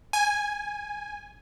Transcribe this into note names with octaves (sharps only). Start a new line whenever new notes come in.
G#5